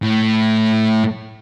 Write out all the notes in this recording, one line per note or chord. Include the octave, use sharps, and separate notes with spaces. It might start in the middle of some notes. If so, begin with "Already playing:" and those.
A2